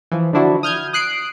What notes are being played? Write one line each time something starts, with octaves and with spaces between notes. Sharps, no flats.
E3 F3
D3 F3 D4 E4 F#4
D#6 F6 G6 G#6
D#6 F#6 C7 D7